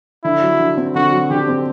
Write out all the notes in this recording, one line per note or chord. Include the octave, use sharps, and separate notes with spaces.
D3 E4
F#3
D3
C4
D3 F#4
F#3
D3 G4
C4